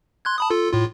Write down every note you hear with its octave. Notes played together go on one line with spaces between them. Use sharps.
C6 F#6 G#6
A5 B5 D#6
F4 A4
A2 F4